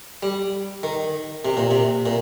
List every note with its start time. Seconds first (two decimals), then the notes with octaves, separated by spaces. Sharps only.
0.23 G3
0.83 D#3
1.45 C3
1.57 A#2
1.71 C3
2.06 A#2